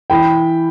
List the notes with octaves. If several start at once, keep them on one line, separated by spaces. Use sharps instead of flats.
E3 G5 B5